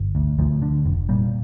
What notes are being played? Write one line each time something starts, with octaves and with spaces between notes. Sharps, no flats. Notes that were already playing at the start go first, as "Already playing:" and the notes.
Already playing: G1
D2
D2 F3
D3
F1
A#2 G3